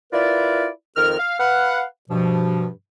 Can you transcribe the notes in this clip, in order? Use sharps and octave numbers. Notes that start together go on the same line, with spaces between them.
E4 F4 A#4 B4 D5
F2 D#3 A#4 F6
F5
B4 F5 F#5
G2 B2 F3